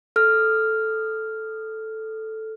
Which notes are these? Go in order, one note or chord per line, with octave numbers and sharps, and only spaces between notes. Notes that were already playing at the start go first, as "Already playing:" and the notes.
A4 F6